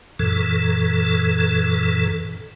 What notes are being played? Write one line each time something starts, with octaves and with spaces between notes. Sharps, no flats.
F#2 A#2 E3 A4